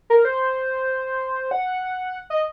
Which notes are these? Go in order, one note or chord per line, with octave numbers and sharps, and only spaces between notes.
A#4
C5
F#5
D#5